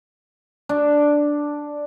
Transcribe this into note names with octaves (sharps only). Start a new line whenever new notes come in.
D4